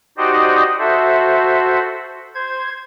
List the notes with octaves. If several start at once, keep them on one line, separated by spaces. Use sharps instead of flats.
D#4 F#4 G4 C5 D5 D#5
F#4 A4 C5 E5
C5 G#6